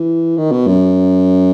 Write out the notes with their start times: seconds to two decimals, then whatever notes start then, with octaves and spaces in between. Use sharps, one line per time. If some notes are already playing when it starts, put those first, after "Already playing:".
Already playing: E3
0.38 D#3
0.52 B2
0.67 F#2